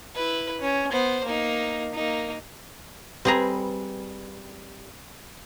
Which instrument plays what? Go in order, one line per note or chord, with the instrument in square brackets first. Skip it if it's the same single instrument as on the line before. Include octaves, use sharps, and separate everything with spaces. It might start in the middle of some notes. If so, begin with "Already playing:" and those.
[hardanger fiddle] E4 B4
C#4
B3 C5
A#3 D#4
A#3 D#4
[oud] G3 B4 [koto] C4 G#4 A#5